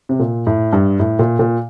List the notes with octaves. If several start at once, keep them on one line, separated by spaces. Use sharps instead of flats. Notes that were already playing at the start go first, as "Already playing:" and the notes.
C3
A#2
A2
G2
A2
A#2
A#2